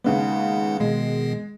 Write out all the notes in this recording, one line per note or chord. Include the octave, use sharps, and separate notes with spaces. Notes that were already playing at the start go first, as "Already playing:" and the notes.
D#2 C#3 G#3 B3 D#4 F#5
B2 D#3 G#3 B3